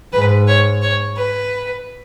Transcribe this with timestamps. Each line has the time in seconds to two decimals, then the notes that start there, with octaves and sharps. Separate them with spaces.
0.13 G#2 B4
0.48 C#5
0.82 C#5
1.17 B4